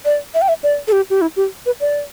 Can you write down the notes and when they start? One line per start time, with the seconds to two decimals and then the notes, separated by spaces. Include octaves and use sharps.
0.05 D5
0.34 E5
0.42 G5
0.48 E5
0.63 D5
0.88 A4
0.92 G4
1.10 G4
1.21 E4
1.36 G4
1.66 B4
1.80 D5